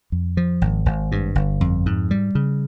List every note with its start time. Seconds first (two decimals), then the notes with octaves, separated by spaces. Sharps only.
0.12 F2
0.37 F3
0.61 G#1
0.86 G#1
1.12 G2
1.35 G1
1.61 F2
1.86 G#2
2.11 G3
2.35 C#3